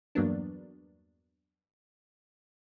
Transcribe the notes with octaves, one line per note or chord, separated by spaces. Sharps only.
E2 G2 F#3 A#3 B3 D4